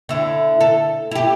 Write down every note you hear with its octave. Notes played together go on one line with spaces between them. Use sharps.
D3 E4
A4
E4 G4